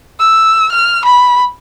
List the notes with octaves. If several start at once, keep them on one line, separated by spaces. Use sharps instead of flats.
E6
F6
B5